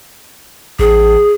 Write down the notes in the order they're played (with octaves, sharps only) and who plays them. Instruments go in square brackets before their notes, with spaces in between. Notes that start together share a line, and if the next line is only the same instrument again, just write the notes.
[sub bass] A1 [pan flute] G#4